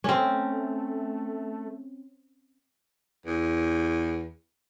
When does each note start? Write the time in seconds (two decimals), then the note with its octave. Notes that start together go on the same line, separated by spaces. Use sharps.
0.04 A3 C4 C#4
3.26 E2